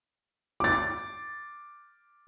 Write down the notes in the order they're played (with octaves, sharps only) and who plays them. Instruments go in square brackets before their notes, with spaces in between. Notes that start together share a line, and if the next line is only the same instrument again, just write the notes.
[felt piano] D6 A6